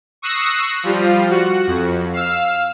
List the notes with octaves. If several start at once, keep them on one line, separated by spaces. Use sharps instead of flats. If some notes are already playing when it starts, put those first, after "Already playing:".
C#6 D#6 E6 F#6 A#6 C7
F3 G3 F4
F#4 F#5
F2
F5 E6